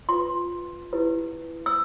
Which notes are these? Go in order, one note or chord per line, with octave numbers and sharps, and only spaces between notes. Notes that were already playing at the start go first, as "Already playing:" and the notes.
F4 B4 C6
E4 G4 B4
E6